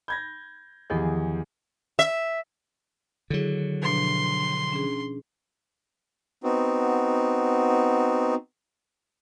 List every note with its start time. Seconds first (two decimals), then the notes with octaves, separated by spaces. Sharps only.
0.08 B5 G6 G#6 A#6
0.90 E2 D#3 F3 B3 G4 G#4
1.99 E5
3.30 D3 D#3 F#3 E4 G#4
3.83 B2 F3 D4 C6
4.73 C#4 D4 G#4
6.44 B3 C4 D#4 F#4